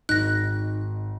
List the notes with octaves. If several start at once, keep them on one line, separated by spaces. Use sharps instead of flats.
G#1 D#4 F#6 A#6